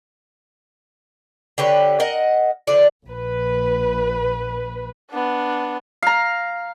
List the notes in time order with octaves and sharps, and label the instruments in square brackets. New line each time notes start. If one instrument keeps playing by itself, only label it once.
[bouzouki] D3 G4 B4 C#5
A#4 D#5 F#5
D3 F3 D4 D5
[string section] A#1 B4
[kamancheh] B3 D4
[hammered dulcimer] F5 A#5